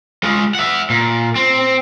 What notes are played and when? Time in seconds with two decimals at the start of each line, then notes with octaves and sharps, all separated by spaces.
0.23 G#3 F4
0.55 E5 F#5
0.90 A#2
1.36 C4